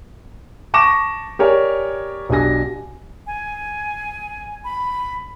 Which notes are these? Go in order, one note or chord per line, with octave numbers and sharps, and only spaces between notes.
A5 C#6 D6 A#6 E7
G4 A#4 C#5 D5 G#5
B1 D4 G4 G#5 A#6
G#5
B5